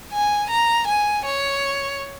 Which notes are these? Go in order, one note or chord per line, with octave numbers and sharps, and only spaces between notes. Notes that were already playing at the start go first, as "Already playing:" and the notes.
G#5
A#5
G#5
C#5